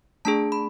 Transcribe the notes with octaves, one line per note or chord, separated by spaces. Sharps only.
A3 D4 G#4 A5
B5